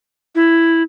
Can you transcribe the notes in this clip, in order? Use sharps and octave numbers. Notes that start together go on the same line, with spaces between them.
E4